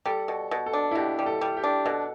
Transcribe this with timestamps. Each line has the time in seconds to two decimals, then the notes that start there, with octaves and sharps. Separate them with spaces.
0.05 G3 A4
0.28 B2
0.51 B2
0.66 A4
0.73 D4
0.91 E4
0.95 B2 G4
1.19 G3
1.26 A4
1.41 G3
1.57 G4
1.64 D4
1.86 B2 A4